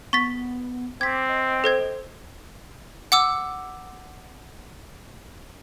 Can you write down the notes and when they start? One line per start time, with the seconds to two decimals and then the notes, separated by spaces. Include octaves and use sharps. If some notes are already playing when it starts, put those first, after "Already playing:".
0.13 B3 C#6 A6 B6
1.01 C4 D6 G#6 B6
1.29 D#5
1.64 A4 C5 G#6
3.12 F#5 D6 E6